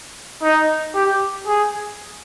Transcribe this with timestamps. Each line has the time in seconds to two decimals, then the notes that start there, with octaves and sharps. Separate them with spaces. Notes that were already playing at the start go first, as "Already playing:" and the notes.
0.43 D#4
0.95 G4
1.47 G#4